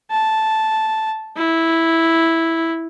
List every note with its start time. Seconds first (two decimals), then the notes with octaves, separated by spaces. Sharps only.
0.11 A5
1.37 E4